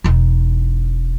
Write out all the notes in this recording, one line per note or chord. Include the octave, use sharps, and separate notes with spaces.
E1 D#4